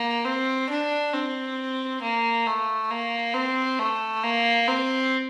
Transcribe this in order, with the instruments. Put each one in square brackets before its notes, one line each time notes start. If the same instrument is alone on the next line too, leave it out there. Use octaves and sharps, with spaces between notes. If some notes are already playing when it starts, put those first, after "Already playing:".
Already playing: [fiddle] A#3
C4
D4
C4
A#3
A3
A#3
C4
A3
A#3
C4